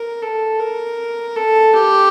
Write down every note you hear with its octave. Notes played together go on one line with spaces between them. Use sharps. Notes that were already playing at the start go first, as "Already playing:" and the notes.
Already playing: A#4
A4
A#4
A4
G4